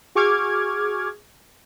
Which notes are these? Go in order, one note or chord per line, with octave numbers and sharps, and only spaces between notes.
F#4 G#4 C#6 D6 F6 G#6